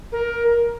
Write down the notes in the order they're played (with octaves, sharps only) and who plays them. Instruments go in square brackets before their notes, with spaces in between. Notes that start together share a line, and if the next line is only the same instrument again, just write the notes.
[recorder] A#4